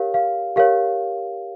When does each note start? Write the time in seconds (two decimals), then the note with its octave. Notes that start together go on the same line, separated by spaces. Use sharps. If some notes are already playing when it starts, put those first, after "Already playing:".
Already playing: G4 A#4 C#5 F5
0.14 F5
0.56 G4 A#4 C#5 F5